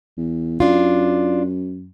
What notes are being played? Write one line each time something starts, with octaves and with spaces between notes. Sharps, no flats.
E2
F#2 D4 F4